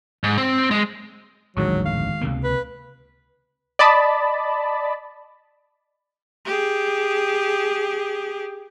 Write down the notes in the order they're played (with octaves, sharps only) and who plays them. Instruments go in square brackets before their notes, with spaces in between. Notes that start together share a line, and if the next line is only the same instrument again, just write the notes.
[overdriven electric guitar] G#2
C4
G#3
[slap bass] D1 A#1 F2 [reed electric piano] D#3 G#3 C#6 [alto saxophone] F#3
[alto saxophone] F5
[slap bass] C#2 C3 A#3
[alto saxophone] B4
[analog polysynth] D5 D#5 A5 B5
[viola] G4 G#4